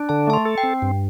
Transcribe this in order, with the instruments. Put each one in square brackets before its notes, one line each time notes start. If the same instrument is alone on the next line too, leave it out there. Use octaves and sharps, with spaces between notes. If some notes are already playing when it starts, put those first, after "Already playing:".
Already playing: [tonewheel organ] D4
[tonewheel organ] D3 [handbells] A5
[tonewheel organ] A3 [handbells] A5
[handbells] C6
[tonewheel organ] A4
[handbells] G5
[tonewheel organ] C4
G2